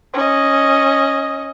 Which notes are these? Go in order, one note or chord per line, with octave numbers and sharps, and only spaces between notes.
C#4 D#5